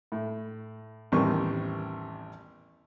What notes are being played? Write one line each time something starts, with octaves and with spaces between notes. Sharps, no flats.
A2
A1 E2 D#3 G3 C4 C#6